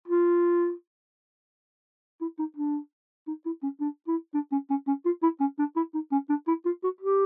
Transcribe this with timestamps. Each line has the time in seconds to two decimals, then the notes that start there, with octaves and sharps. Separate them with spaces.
0.08 F4
2.21 E4
2.39 D#4
2.56 D4
3.28 D#4
3.46 E4
3.63 C#4
3.81 D4
4.08 E4
4.34 D4
4.52 C#4
4.70 C#4
4.87 C#4
5.05 F4
5.23 E4
5.40 C#4
5.59 D4
5.76 E4
5.94 D#4
6.12 C#4
6.29 D4
6.47 E4
6.65 F4
6.83 F#4
7.01 G4